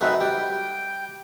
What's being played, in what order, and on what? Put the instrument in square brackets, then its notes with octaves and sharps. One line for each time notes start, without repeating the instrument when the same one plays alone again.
[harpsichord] F#2 A3 [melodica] C4 D#4 B4
[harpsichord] G3 [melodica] G5